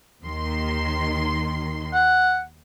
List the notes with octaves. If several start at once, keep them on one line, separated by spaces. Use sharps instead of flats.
D#2 D#3 C6
F#5